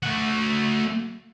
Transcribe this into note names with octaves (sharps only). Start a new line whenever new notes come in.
A3 F#4